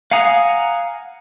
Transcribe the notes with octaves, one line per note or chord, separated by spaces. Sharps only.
F5 F#5 G#5 A#5 D#6